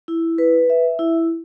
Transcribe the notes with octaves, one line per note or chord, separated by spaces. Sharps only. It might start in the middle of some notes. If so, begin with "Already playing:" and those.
E4
B4
E5
E4